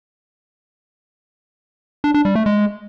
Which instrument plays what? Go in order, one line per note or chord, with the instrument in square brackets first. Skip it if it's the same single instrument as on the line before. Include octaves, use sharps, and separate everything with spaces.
[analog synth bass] D4
D4
G3
A3
G#3